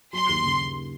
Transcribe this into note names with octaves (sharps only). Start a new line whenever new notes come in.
F#3 C6
D#2
C#3